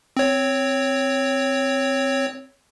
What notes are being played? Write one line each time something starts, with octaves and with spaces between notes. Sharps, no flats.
C4 C#5